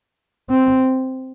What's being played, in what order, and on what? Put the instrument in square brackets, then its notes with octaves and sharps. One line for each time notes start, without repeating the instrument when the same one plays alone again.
[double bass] C4